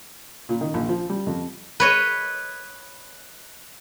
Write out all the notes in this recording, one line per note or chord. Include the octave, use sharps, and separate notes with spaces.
A#2
D#3
A#1
F3
G3
F2
B4 C#5 D#5